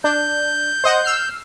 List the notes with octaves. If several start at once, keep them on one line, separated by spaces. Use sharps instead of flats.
D4 G6
C5 D#5 F#5
E6 F6 C7